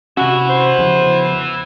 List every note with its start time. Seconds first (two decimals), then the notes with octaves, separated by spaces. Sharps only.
0.17 C3 C#4 E4 F#4 B4
0.49 C5
0.78 E2 C#3 F3